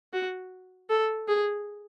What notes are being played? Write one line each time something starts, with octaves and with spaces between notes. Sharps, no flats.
F#4
A4
G#4